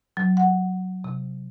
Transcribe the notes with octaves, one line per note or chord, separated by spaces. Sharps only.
F#3
F#5
C3